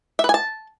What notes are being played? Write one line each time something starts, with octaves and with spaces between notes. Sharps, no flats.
E5
B4
G#5
A5